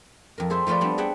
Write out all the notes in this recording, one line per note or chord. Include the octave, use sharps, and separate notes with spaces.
F2 A#4
G#4 A4 C5 E5
F3 A3 F4 B4 D5
G3 B3 C4 D4
G#4 A4 E5 F#5 G5